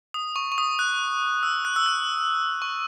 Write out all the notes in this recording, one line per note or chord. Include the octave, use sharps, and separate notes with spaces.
D#6
C#6
C#6
D#6
F#6
E6
F#6
E6
F#6
C#6